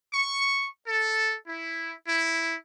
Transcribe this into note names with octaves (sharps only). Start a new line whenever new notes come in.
C#6
A4
E4
E4